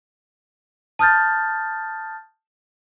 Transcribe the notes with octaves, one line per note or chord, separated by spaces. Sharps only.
A5 D#6 F6 G6 A6